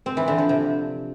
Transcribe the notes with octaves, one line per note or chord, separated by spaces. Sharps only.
C4
E3
D3
F3
C3